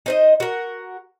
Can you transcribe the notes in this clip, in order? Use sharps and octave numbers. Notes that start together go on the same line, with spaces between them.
D#4 C5 D#5
F#4 A#4